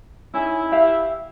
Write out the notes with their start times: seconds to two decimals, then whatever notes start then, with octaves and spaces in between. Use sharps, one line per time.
0.34 C#4 D#4 E4 G#4
0.72 G4 E5 F5